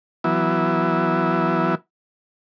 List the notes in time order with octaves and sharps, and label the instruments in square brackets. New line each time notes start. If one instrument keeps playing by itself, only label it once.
[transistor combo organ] E3 F#3 B3 E4